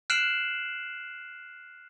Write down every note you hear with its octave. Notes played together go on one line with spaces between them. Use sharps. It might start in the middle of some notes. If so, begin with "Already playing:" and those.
F6 F#6 C7 D7 E7 F#7